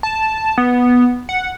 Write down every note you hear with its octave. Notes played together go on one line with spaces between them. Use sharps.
A5
B3
F#5